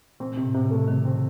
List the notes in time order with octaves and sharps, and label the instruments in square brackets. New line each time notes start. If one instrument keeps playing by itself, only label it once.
[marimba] A#2 [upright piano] C4
[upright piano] C3
[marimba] A2
[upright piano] C3
[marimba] C#3 [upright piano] A3
[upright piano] C3 [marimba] D#3
[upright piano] C4